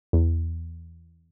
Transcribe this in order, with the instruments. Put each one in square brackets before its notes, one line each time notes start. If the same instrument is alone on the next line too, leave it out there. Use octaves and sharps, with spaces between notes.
[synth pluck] E2